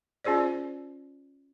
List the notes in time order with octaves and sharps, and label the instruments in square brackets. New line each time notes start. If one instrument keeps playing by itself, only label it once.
[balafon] C#4 F4 G#4 C5 D5